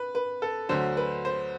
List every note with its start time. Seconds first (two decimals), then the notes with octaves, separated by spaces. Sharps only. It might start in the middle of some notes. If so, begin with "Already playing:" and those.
Already playing: B4
0.15 B4
0.42 A4
0.69 D2 D3 F#3 C5
0.97 B4
1.25 C5